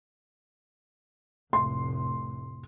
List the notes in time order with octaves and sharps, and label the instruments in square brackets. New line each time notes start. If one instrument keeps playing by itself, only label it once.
[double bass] F1 A2 [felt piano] C6